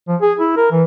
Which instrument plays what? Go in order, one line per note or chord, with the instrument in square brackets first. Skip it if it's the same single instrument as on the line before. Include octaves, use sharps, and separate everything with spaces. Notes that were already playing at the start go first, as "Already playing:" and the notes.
[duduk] F3
G#4
E4
A#4
E3